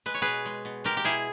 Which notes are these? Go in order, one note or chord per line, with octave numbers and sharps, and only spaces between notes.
G#3 B4
C#5
B2 G#4 B4
G#3
B2
G#3 G4 A#4
G4
B2 E4 G#4